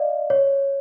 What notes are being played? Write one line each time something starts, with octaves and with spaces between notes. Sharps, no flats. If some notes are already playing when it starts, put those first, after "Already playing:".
Already playing: D5 D#5 F5
C#5